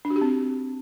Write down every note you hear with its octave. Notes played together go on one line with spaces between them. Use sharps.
D4
F#4
G4
C4